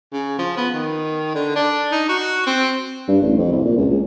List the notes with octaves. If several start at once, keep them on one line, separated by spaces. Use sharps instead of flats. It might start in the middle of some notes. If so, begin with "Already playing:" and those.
C#3
F3
B3
D#3
D3
D4
D#4
F#4
C4
G2
A1
F2
C2
A#2
C#2
C#2